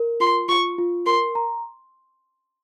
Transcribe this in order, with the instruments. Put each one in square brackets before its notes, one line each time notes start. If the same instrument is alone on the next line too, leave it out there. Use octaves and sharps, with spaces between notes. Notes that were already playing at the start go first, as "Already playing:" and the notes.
Already playing: [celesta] A#4
[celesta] F4 [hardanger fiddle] C6
[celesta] F4 [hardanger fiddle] C#6
[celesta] F4
[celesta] A#4 [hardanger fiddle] C6
[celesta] A#5